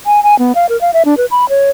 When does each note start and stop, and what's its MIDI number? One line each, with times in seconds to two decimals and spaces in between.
0.06 0.23 80
0.23 0.37 80
0.39 0.52 59
0.55 0.66 77
0.69 0.79 70
0.81 0.91 77
0.94 1.03 76
1.05 1.17 62
1.17 1.26 71
1.31 1.49 83
1.49 1.70 73